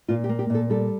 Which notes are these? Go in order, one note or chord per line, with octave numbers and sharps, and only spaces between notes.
A#2 F4
G4
A#3
G4
A#2 A4
G3 A4